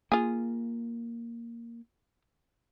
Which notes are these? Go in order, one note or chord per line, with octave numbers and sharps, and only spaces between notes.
A#3 F4 G#4